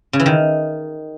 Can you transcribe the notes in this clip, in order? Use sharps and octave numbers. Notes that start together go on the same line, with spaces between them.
C#3
E3
D#3